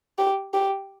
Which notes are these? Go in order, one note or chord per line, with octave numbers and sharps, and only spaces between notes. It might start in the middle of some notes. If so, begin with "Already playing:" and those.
G4
G4